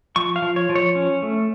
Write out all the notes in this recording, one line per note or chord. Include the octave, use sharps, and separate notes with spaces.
F3 C#6
F5
F3
C#5
F3
C#5
C#4
A3